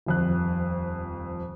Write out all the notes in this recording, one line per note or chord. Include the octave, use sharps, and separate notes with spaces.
D#1 F2 F#6